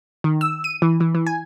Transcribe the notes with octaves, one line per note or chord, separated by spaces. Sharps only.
D#3
E6
D#7
E3
E3
E3
G#5